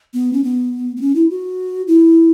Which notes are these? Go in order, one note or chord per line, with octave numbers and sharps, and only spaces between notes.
B3
C#4
B3
B3
C#4
E4
F#4
E4